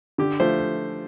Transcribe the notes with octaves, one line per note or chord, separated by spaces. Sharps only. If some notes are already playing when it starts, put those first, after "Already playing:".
D3 G4
F3 A3 C5